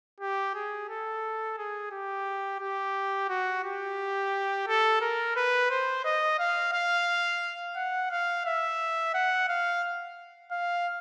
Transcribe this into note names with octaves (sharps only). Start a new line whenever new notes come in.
G4
G#4
A4
G#4
G4
G4
F#4
G4
A4
A#4
B4
C5
D#5
F5
F5
F#5
F5
E5
F#5
F5
F5